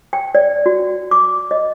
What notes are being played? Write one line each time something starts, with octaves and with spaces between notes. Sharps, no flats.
G5
D5
F#4
D6
D#5